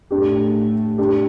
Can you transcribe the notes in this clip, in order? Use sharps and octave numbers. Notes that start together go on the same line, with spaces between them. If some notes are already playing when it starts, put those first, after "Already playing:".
A2 A3 D4 G4
D4 G4